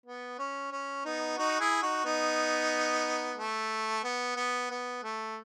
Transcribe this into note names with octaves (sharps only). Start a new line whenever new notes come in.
B3
C#4
C#4
B3 D#4
D#4 F#4
E4 G#4
D#4 F#4
B3 D#4
A3
B3
B3
B3
A3